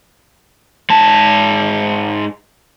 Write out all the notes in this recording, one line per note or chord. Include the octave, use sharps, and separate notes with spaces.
G#2 A5